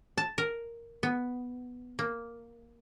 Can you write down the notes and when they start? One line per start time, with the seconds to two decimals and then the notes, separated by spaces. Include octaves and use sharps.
0.17 A5
0.38 A#4
1.03 B3
1.99 A#3